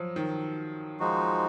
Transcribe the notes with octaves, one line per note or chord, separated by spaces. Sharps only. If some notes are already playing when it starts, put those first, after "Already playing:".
Already playing: F3 F#3
D#3
F3 G#3 D#4 F#4